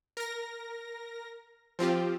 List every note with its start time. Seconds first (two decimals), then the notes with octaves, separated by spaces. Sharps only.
0.17 A#4 A#6
1.79 F3 C4 F4 G4